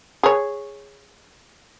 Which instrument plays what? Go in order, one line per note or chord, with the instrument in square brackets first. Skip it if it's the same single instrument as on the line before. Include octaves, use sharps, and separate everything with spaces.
[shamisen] G#4 C#5